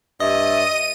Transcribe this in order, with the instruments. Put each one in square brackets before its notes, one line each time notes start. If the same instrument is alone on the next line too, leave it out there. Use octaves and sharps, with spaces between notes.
[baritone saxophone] G2 [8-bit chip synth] D#5 [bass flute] E5 [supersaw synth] D#7